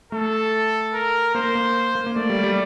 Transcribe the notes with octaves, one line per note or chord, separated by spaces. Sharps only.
A3 A4
A#4
A#3 C5
A#3
A#3
A#3
A3 D5
G3
G3